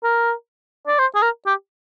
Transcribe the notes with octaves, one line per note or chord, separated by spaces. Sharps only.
A#4
D5
C5
G#4
A#4
G4